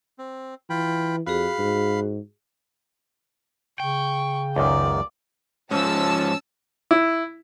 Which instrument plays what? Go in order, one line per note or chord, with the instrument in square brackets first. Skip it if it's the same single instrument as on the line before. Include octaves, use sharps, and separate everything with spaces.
[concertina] C4
[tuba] E3 [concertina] F4 G5 B5
[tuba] F2 [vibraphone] F#4 G#4 [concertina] F5 B5
[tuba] G#2
[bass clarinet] C#3 [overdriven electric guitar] G5 [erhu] C#6
[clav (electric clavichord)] C#2 F#2 D#3 [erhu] D5
[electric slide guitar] G#2 F3 [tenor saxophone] C#4 [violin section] A5 E6
[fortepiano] E4